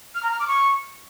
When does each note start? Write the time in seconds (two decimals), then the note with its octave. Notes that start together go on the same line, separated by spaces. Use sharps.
0.15 F6
0.23 A#5
0.31 F6
0.40 D6
0.48 C#6